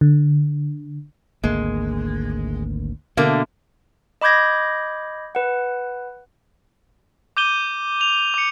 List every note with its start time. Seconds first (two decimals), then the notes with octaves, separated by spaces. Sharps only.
0.01 D3
1.44 G#1 D2 G#3 A#3
3.17 B2 D3 A3 A#3
4.21 D#5 B5 D6 G6 G#6 A#6
5.35 B4 F#5
7.37 D6 G6 D#7 G7
8.01 F7
8.34 D6 C#7